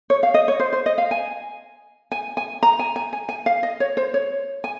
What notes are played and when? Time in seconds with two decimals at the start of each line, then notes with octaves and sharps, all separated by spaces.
0.10 C#5
0.23 F5
0.34 D#5
0.48 C#5
0.60 C5
0.73 C5
0.86 D#5
0.98 F5
1.11 G#5
2.12 G#5
2.37 G#5
2.63 A#5
2.79 G#5
2.96 G#5
3.13 G#5
3.29 G#5
3.46 F5
3.63 D#5
3.80 C#5
3.97 C5
4.14 C#5
4.64 G#5